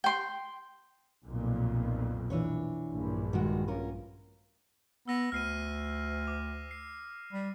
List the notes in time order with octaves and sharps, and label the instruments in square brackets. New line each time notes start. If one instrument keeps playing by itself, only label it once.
[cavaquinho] G5 C6
[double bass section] B1 F2 A#2
[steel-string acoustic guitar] E3 D4 C#5
[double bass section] A#1 G2
[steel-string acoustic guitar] D#3 G#3 F#4
C#4 F4 A#4
[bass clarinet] B3 [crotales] E6 A#6
[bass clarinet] D2 [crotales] F6 C7 D#7
[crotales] D6
C7
[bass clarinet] G3